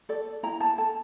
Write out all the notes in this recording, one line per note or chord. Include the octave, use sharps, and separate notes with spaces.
A4 D5
E4 A#5
A5
A4 A5